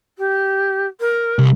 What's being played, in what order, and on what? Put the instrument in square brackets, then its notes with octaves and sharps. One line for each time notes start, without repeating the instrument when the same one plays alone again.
[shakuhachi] G4
A#4
[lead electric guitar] C2